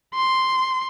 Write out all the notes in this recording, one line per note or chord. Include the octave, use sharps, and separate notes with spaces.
C6